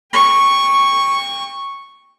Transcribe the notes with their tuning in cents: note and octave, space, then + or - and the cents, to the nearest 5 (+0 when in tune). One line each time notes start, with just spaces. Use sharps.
G5 +30 C#6 -5